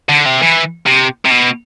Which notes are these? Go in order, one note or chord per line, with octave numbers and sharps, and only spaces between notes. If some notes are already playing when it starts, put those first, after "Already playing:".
D3
C3
E3
C3
C3
B2